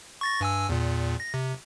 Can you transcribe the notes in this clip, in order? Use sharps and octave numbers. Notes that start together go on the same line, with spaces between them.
C#6 A6 A#6
G2 G#5 E6
E2 A#2
A#6
C3